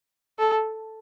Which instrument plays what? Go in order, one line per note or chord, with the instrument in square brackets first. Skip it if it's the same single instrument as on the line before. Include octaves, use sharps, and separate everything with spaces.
[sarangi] A4